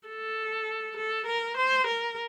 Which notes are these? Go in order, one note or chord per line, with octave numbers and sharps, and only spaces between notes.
A4
A4
A#4
C5
A#4